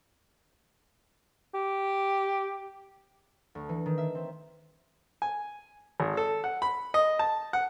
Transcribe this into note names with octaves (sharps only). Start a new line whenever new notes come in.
G4
D2
E3
D#3
E5
C4
G#5
G#1
A4
F#5
B5
D#5
A5
F#5